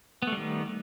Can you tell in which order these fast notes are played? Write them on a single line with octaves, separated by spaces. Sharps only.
B3 A3 G3 D#3